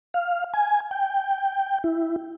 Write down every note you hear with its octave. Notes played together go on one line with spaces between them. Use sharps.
F5
G#5
G5
E4